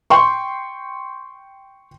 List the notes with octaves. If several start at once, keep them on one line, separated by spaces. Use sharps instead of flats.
G5 C6 C#6